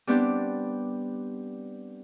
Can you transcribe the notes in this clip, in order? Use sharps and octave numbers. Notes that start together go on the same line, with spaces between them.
G3 B3 C4 D4 G4